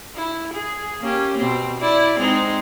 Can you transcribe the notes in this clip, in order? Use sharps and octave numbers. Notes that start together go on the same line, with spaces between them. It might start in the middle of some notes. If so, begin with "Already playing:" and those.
E4
G#4
A#3 C#4 G4
B2 C4
E4 D5
G#3 C4 D#4